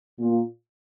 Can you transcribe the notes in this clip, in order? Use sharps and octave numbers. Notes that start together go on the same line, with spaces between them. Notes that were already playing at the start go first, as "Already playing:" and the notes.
A#2 A#3 F4